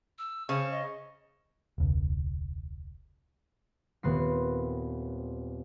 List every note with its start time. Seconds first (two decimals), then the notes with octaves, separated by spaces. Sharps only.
0.18 E6
0.49 C#3 C5 C#6
0.71 D#5
1.78 E1 C#2
4.03 D#1 B3 C4 C7